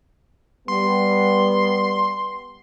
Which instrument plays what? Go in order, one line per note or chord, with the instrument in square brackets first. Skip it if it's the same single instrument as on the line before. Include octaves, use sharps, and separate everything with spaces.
[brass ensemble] G3 B3 [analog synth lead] C6